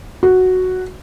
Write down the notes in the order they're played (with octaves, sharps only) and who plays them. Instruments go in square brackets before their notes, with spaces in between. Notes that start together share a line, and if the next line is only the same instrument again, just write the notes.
[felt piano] F#4